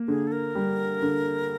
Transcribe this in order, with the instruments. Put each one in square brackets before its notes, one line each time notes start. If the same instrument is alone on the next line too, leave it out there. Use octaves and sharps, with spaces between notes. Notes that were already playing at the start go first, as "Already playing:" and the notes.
Already playing: [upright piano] A#3
[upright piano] D3 [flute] G#4
[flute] A4
A#4
[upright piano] G3
D3